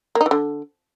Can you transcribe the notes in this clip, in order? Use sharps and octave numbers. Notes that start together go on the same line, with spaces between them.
A#3
D#4
E3
D3